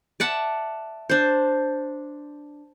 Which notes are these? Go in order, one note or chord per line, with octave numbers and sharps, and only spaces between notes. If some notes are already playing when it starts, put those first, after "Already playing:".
D5 E5 F#5 A5
D4 C5